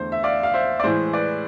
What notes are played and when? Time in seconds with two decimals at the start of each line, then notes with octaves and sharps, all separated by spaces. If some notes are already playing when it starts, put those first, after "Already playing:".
Already playing: E2 D3 A3 C5
0.12 E5
0.23 D5 F5
0.43 F5
0.54 C5 E5
0.80 D5
0.84 A2 E3 G#3 C5
1.13 B4 D5